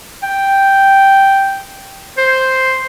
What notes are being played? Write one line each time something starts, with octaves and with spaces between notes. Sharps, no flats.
G5
C5